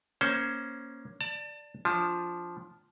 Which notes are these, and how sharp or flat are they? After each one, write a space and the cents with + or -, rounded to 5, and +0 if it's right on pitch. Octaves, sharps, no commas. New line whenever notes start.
A#3 +20 C#4 +0 C5 +0
D5 +0 A5 +30
F3 +0 D4 -20